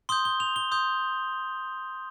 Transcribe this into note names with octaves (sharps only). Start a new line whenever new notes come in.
C6 D#6 G6 G7
G7
F7
G7
C6 D#6 G6